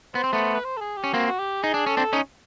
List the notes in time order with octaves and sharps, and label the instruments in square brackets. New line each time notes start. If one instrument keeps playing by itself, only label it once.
[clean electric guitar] B3 [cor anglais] C5
[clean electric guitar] C4
A3 B3
[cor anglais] B4
C5
A4
G#4
G4
[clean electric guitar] C#4
[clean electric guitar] A#3 C4 [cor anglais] F#4
[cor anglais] F#4
G4
[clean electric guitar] D#4 [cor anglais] G#4
[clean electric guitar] D4
[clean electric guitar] C#4 [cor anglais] A4
[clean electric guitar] C4 D4
C#4 D#4